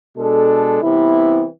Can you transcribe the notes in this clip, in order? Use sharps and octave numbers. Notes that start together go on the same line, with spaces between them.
B2 G#3 D4 A4
C2 C3 E3 B3 E4